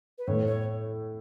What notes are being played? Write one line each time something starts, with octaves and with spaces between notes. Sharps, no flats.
B4
A2 C#5
C#5